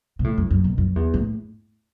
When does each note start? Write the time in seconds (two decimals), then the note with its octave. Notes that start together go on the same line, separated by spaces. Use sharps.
0.19 B2
0.24 A2
0.38 F#2
0.50 F#2
0.64 B2
0.78 F#2
0.96 E2
1.14 A2